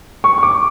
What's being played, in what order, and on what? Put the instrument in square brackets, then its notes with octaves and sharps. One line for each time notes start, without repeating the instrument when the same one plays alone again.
[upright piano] C#6
C#6
D6